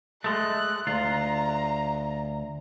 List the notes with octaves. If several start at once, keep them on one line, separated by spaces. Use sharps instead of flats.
G#3 A3 F#6
D2 F4 A#5